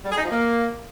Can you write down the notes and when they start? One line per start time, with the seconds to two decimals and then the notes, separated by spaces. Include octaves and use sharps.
0.04 G3
0.10 G#4
0.17 D#4
0.24 F3
0.30 A#3